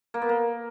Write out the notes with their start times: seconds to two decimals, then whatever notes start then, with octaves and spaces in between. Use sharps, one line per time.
0.14 A#3
0.22 B3
0.29 A#3